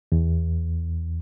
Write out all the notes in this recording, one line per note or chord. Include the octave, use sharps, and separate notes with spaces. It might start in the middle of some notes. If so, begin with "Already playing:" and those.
E2